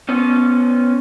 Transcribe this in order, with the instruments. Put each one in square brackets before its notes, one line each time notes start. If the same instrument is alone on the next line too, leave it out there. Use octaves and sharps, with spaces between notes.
[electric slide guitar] B3 C#4